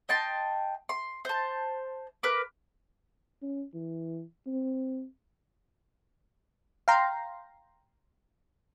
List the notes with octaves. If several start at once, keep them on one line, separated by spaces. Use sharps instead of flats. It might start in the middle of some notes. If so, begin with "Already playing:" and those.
D#5 G5 A5 C6
C6
C5 A5
A#4 B4 D6
C#4
E3
C4
F5 G5 A#5 C6